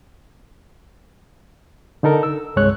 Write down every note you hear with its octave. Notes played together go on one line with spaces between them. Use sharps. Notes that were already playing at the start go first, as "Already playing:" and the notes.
D3 D#4 A4 A#4
E6
C2 G2 G#3 C#5 F#6